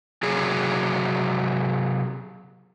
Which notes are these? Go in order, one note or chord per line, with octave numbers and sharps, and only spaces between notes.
C3 F#3 G#4